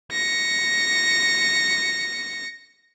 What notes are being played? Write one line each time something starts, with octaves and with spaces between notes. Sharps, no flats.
A#6 C#7